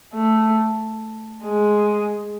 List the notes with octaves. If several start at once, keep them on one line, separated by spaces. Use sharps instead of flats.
A3
G#3